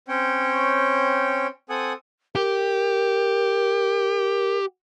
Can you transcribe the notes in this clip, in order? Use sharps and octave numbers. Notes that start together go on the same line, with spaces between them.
C4 C#4 C#5 G5
C4 A4 F#5 G#5 D#6
G4 A#4